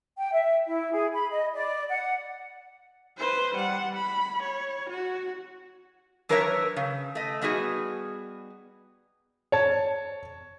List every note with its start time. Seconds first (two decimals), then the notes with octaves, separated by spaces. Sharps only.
0.18 G5
0.33 E5
0.67 E4
0.92 G#4
1.13 B5
1.31 D#5
1.54 D5
1.89 F#5
3.17 B4 C5
3.55 G3 F#5
3.95 B5
4.43 C#5
4.90 F#4
6.29 F#3 D4 A#4 B4 C#5 E5
6.76 C#3
7.15 A3 D#5
7.41 G3 B3 D#4 F#4 G#4
9.52 C#5 A5